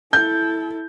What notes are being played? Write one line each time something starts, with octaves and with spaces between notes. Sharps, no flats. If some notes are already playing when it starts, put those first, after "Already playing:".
E4 A4 G6